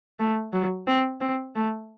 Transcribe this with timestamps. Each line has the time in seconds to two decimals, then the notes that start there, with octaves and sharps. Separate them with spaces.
0.20 A3
0.53 F#3
0.87 C4
1.21 C4
1.56 A3